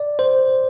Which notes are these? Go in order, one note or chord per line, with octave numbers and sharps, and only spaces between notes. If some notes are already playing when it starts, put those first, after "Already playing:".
Already playing: D5
C5